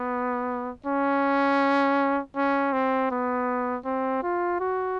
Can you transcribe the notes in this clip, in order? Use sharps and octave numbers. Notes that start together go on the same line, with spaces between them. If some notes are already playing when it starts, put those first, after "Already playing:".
Already playing: B3
C#4
C#4
C4
B3
C4
F4
F#4